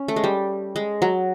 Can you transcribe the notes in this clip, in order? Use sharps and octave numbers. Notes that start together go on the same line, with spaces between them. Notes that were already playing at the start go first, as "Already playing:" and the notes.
Already playing: C#4
A3
G#3
G3
G#3
F#3